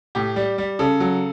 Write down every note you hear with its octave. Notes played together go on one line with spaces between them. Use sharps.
A2 G4
G3
G3
C#3 A4
F#3